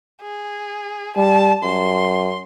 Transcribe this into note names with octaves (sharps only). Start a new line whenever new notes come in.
G#4
G3 A5
F#2 C6